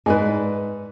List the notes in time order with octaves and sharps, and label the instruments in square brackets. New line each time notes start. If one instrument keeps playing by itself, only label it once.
[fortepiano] G#2 [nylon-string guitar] B4 D5 G#5